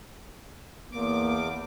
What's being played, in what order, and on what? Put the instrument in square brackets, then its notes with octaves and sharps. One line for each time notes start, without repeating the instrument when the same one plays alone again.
[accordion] E2 D6 [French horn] A#3